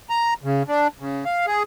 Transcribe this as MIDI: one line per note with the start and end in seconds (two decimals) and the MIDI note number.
0.10 0.34 82
0.44 0.63 49
0.68 0.88 62
1.00 1.24 49
1.25 1.46 77
1.47 1.63 68